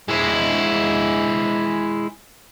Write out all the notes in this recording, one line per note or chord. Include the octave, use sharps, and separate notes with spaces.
G#3 E4